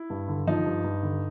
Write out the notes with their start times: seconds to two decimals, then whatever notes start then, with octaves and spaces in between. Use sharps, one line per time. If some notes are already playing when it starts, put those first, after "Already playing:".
Already playing: E4
0.10 G2
0.28 D3
0.47 F3 D#4
0.66 G2
0.84 G2
1.03 D3